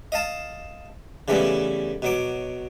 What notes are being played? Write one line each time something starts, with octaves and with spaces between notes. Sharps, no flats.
D#5 F5 A5
C#3 E3 G3 A3 B3
B2 F#3 D6